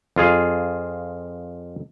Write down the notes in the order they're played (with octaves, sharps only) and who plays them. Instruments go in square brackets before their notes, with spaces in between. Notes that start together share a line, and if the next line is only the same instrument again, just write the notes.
[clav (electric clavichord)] F2 F4 G#4 F5